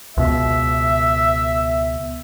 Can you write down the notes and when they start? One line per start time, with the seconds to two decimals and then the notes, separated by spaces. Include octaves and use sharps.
0.17 C#2 B2 E5